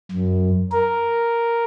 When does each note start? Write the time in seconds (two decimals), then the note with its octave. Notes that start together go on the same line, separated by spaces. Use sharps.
0.11 F#2
0.72 A#4